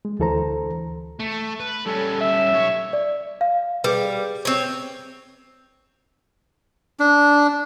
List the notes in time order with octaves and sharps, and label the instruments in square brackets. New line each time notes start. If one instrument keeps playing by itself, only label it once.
[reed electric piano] G#3
D2 E3 A4 C5 A#5
[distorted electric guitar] A3
B4
[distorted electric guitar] G3 C#4 [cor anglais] A4
[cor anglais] E5
[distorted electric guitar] B1 C#5
[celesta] D5
F5
[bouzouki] G3 [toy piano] G#4 B4
[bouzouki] C4 C#5
[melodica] D4